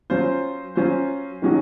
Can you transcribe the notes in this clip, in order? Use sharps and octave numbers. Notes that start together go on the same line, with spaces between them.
F#3 C#4 F4 C5
F#3 C#4 F4 C5
D#3 F#3 C#4 F#4